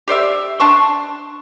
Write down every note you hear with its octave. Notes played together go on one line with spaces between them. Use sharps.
G4 C5 D5 E5
D4 A5 C6 C#6